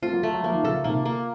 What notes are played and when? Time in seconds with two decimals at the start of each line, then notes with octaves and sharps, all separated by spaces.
0.02 A3 C4 F4
0.12 F#3 A#3
0.23 A3
0.33 F#3
0.43 F3 A#3
0.53 D#3
0.63 C#3 F3 A4
0.84 C3 D#3 A#3
1.05 A#3